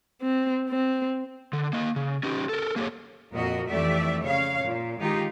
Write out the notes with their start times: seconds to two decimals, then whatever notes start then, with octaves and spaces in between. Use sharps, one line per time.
0.22 C4
0.70 C4
1.53 D3
1.73 A#3 D#5
1.96 C#3
2.23 C#4 D#4 G4
2.49 A4 A#4
2.76 A#3 G4 G#4 C#5
3.32 F2 A#2 F#4 A#4 D#5
3.67 F2 E3 A3 G4 D5 E5
4.21 C#3 C#5 F5
4.63 A#2
4.99 D#3 G#3 D#4 F4 G4